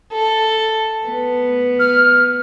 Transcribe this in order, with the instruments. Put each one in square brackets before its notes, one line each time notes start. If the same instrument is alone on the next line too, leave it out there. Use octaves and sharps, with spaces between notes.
[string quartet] A4
B3
[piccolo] F6